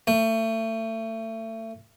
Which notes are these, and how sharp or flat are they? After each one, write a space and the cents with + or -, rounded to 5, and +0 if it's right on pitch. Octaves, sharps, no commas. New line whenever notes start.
A3 +30